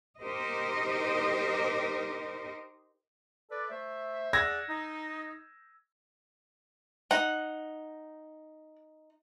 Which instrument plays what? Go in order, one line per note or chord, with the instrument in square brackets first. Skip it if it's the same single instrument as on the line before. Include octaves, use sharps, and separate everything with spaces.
[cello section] D#4 G4 A#4 C5 D#5
[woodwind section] A4 B4 D5
A3 C5 E5
[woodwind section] G#4 D5 F#5 [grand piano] E6 G#6 A#6
[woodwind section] D#4
[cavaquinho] D#4 [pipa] F#5